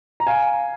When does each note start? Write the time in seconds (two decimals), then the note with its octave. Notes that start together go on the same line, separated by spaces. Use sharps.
0.20 A#5
0.27 F5 G#5